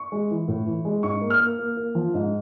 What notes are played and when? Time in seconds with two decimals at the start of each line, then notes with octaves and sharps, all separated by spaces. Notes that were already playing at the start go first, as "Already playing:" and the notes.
Already playing: C#6
0.12 G#3
0.31 E3
0.48 A2
0.66 E3
0.85 G#3
1.03 G#2 C#6
1.21 A#3
1.30 F6
1.40 A#3
1.59 A#3
1.77 A#3
1.95 F3
2.14 G#2